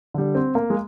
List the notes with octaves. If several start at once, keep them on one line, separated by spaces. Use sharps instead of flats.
D3 G3
C4
A#3
G#3